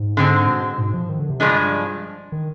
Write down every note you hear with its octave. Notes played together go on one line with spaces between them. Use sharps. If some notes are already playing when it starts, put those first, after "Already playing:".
Already playing: G#2
D3 G#3 C4
B2
G#2
F3
D#3
D3
C3
G2 F3 G#3 D4
D#3